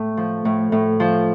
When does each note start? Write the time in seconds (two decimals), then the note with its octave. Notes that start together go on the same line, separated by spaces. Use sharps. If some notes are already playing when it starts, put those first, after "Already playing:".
Already playing: A2 A3
0.17 F3
0.45 A2
0.72 A2
1.00 F3